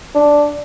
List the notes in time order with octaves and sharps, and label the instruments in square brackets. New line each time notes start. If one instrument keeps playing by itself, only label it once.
[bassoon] D4